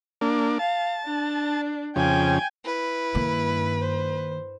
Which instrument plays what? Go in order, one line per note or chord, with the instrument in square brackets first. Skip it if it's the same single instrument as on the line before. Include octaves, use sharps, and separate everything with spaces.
[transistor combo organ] A#3 D4
[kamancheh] F5 [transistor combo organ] A5
[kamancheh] D4
[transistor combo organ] F2 C#3 [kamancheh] G5 G#5
[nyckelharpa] E4 [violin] B4
[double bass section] G2 [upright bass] D#3 A#3
[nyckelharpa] C5